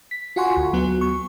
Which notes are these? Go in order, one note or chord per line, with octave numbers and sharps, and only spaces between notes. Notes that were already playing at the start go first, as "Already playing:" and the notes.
B6
F4 F#4 F#5 G#5 C6 C#6
D2
F#3 B3 F#4
C#6